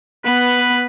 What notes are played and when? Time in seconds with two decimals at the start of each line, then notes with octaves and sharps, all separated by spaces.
0.25 B3 B4